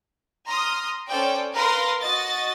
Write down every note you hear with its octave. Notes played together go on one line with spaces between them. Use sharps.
A#5 C6 D#6 F6
C#4 A4 C5 D5 G5
A#4 B4 F5 A#5 C6
F#4 D#5 A6